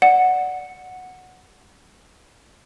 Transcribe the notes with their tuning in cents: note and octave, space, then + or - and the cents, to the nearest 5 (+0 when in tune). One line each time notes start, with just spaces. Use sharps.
D5 +5 F#5 -5